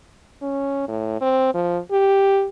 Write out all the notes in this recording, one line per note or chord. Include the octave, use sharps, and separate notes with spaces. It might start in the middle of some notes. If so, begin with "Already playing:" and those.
C#4
A2
C4
F3
G4